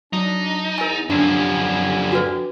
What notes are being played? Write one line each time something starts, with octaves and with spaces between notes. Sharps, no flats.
F#3 D4 D#4
E2 A#4 G#5 A#5 A6
F#2 D3 F3 D4 G4 F#5 G#5
F#4 B4